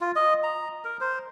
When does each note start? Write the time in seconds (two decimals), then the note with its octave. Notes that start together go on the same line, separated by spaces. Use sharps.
0.01 F4
0.16 D#5
0.44 A#5
0.85 A#4
1.01 C5